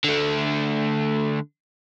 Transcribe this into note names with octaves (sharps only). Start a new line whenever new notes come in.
D3 A3